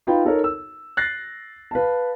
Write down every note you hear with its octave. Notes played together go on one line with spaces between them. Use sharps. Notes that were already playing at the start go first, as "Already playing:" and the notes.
D#4 F4 B4 F5 G5 B5
D#4 A4 A#4 C#5
E6
F#6 A6 A#6 C7
B4 F5 A5